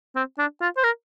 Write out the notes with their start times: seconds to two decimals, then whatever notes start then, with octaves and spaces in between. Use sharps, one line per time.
0.16 C4
0.38 D4
0.61 F4
0.77 C5
0.84 A#4